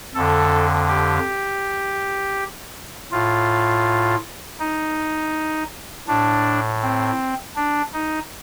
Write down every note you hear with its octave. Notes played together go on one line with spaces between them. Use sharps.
F2 D3 A4
G4
A2 F4
D#4
A2 D4
C4
D4
D#4